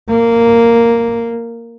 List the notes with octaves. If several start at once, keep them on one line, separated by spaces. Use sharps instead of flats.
A#3